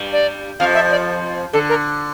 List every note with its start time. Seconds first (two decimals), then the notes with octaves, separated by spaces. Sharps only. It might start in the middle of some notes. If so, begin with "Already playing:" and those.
Already playing: G2 G3
0.13 D5
0.60 F2 F3 F5
0.75 E5
0.91 D5
1.53 D3 A4
1.69 A#4